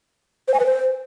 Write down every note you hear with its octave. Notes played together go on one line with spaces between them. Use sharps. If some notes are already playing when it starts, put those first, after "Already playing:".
C5
G#5
B4
C5